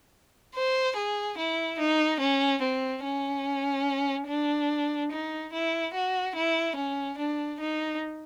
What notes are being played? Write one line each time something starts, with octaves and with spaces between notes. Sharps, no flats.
C5
G#4
E4
D#4
C#4
C4
C#4
D4
D#4
E4
F#4
E4
C#4
D4
D#4